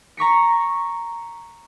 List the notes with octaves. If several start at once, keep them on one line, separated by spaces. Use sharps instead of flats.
A#5 C#6 B6 C#7